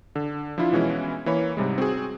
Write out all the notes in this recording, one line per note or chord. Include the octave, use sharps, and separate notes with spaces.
D3
F3 D4 E4 F4
B2 E3 G#3 C#4 E4
E3 A#3 C#5 B5
G#2 C3 G3 G#3
C4 F#4 G#4